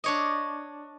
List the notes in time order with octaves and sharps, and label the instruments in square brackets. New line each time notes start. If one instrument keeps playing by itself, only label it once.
[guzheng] D4 C#5 D#5